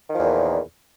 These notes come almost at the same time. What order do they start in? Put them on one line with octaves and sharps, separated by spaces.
D#3 F3 E2 A#2